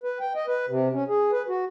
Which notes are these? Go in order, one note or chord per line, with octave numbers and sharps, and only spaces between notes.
B4
G5
D#5
B4
C3
C#4
G#4
B4
F#4